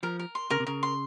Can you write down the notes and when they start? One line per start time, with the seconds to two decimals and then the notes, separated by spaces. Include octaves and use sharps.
0.03 F3 A#4
0.19 A#4
0.35 C6
0.50 C#3 A#4
0.60 C3
0.67 C#3 A#4
0.83 C6